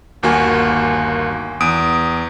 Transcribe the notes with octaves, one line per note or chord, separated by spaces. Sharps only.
G1 D#2 A#3 F#4 G#5
E2 D#6 D7